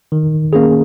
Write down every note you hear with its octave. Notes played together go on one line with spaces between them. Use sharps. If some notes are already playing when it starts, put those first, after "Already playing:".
D#3
A#3 C#4 G#4